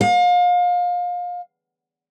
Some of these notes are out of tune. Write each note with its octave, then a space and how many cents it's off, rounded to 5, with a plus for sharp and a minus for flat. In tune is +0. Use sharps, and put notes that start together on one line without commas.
F5 +30